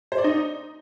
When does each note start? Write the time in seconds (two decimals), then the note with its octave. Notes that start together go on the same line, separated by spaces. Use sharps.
0.12 C5
0.18 D5
0.24 D#4